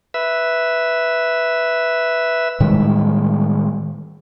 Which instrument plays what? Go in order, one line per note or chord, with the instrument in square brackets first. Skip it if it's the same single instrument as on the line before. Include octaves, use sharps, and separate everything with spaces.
[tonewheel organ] B4 E5
[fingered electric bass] A2 D#3 G3 G#3